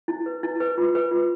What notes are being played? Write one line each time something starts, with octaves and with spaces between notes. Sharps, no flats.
E4
B4
E4
B4
F4
B4
F4